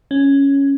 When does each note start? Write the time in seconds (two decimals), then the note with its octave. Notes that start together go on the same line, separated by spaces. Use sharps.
0.11 C#4